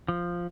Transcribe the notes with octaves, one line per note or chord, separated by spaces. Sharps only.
F3